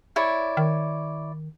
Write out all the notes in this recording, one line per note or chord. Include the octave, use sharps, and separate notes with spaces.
E4 C#5 D5
D#3